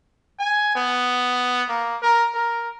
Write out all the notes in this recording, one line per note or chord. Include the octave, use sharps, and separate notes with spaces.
G#5
B3
A#3
A#4
A#4